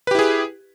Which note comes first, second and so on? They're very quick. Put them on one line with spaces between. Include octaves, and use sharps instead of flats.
B4 G4 E4 G#4